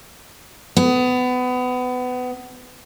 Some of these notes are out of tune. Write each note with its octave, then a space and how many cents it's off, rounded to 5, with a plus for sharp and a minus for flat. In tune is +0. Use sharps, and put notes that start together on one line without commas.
B3 +25